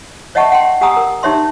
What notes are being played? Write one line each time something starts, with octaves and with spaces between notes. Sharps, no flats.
C#5 D#5 E5 F#5 A5 C#6
F#5 G5 C6
G4 F#5 G#5 A#5 D#6 E6
A#4
D#4 G4 C#5 E5 C6